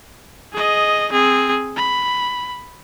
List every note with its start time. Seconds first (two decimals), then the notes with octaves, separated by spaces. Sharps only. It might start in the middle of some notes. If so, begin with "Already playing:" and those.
0.53 G#4 D#5
1.12 C4 G#4
1.76 B5